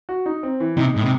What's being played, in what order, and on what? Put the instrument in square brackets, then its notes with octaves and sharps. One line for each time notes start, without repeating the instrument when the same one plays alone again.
[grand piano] F#4
D#4
C4
E3
[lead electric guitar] C3 [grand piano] D#4
[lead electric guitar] A2 [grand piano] G#3
[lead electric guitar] C3